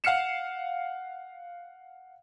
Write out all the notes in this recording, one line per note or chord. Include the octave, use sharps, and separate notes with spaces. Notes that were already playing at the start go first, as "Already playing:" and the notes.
F5 F#5 F6 C7 C#7 E7